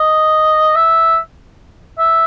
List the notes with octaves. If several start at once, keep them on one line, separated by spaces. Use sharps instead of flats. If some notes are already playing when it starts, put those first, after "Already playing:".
Already playing: D#5
E5
E5